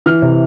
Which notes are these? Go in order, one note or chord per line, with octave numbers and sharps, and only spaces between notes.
E3 F6
C3